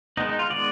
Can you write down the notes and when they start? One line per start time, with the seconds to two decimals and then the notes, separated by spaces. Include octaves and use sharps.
0.17 D#3 G#3 B3 D#4
0.29 D#4
0.39 F4
0.50 D#3 G#3 B3 D5